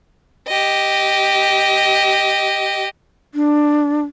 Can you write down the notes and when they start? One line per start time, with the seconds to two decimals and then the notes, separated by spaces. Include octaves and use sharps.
0.48 G4 D#5
3.35 D4